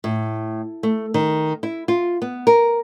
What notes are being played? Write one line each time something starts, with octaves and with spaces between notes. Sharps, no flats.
A2
A3
D#3
E4
F4
B3
A#4